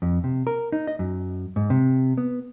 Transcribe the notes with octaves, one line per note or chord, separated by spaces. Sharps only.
F2
C3
A#4
D#4
D#5
F#2
G#2
C3
B3